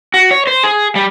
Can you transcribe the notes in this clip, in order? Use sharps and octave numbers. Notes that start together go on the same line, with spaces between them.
F#4
C#5
C5
G#4
G3